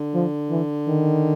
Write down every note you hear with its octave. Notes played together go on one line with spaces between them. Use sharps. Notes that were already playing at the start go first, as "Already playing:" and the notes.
Already playing: D3
F3
E3
D#3